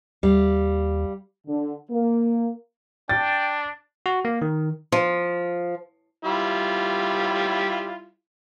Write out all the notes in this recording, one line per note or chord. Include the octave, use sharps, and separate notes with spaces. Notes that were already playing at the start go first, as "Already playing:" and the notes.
D#2 G3 F5
D3
A#3
D4 G5 A6
F#4
A#3
D#3
F3
G3 E4 F4